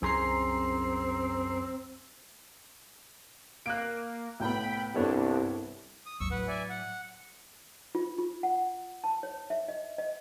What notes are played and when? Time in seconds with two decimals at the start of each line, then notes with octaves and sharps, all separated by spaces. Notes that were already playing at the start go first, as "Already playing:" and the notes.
0.02 C2 F#2 C4 G#4 C5 A#5 C7
3.66 A#3 F#6 D7
4.40 C2 A2 B3 G5 B5
4.95 C2 G2 B3 D4 A4 C#5
6.06 D#6
6.20 G#1 D#2 F#3 C#6 E6
6.31 A2 F#3 B4 F#5
6.48 D5 E5 G#5
6.69 F#5
7.95 F4
8.18 F4
8.43 F#5
9.04 A5
9.23 C#5
9.50 E5
9.69 D#5
9.98 D#5